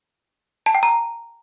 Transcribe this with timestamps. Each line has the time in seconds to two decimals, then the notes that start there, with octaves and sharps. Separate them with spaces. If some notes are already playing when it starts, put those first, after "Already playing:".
0.66 A5
0.75 G5
0.83 A#5